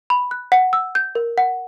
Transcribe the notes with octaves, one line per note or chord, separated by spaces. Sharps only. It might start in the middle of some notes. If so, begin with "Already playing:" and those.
B5
F#6
F#5
E6
G6
A#4
F#5